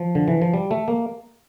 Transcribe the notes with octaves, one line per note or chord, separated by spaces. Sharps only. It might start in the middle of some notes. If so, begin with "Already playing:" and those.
Already playing: F3
D3
E3
F3
G3
A3
A#3